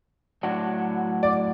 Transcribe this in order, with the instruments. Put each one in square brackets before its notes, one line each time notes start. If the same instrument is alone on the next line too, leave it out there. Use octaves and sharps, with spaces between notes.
[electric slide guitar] A2 F#3 D4 F#4
[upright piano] D5